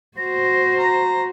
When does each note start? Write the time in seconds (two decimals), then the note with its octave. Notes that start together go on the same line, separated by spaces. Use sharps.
0.18 F#4 C5 A#6
0.78 A#5